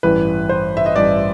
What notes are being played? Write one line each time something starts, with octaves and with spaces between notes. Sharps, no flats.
A1 G2 E3 B4
C5
E5
D#5
A1 G2 E3 D5